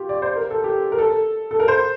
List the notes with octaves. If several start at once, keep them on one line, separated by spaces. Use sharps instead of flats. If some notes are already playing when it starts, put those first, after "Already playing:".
Already playing: F4 G4
D5
C5
A#4
A4
G4
A#4
A4
A4
A#4
C5